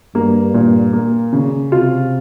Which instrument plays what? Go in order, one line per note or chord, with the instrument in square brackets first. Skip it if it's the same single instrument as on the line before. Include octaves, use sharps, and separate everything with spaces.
[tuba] G2 [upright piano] A#3
[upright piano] A#2
A#3
C#3
[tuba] C3 [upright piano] F4